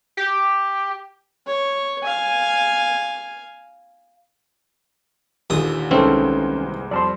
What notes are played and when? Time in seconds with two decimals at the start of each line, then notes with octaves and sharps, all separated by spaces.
0.17 G4
1.47 C#5
2.03 F5 G#5
5.50 D#2 A#2 D3 E3 D#6
5.91 C2 E3 G#3 A#3 C4 C#4 D#4 A4
6.91 F2 G3 C5 D5 A5 C6